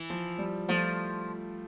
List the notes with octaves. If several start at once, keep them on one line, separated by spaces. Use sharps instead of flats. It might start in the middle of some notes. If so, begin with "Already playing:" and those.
Already playing: E3
F3
G3
F3 A3